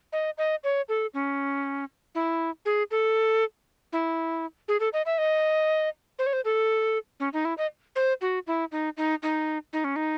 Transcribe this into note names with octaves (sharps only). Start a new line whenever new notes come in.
D#5
D#5
C#5
A4
C#4
E4
G#4
A4
E4
G#4
A4
D#5
E5
D#5
C5
C#5
C5
A4
C#4
D#4
E4
D#5
C5
F#4
E4
D#4
D#4
D#4
D#4
C#4
D#4